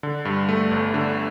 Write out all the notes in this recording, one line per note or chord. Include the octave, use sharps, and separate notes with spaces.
D3
G2
A3
G1
D3